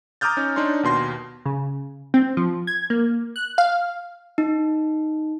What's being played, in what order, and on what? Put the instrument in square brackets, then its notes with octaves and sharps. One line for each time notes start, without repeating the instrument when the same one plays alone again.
[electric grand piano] A#5 D6 D#6 F6 G6 A6
C#4 D#4
D4 D#4 C#5 C6
D#2 B2 C6 A#6
[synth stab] C#3
C4
F3
G#6
A#3
F#6
F5
[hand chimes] D#4